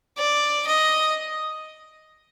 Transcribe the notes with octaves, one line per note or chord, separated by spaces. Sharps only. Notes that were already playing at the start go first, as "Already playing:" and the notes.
D5
D#5